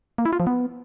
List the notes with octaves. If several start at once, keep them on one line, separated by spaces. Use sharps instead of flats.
A#3
E4
F4
F3
B3